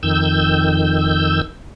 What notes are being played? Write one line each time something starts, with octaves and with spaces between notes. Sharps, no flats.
F2 D#3 E6 G6